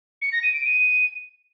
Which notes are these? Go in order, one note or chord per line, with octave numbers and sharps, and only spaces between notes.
C#7
A#6
D#7
D7
D#7